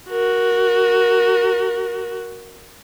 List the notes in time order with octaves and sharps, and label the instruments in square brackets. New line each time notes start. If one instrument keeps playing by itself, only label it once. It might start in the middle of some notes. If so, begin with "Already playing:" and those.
[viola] F#4 A#4